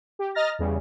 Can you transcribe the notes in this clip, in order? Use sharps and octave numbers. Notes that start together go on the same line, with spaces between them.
G4
D#5 A#5 F6 A6 A#6
E2 C#3 G3